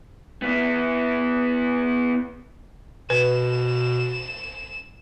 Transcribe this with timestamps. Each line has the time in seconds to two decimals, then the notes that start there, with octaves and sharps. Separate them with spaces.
0.42 B3 E4
3.10 B2 B4 E7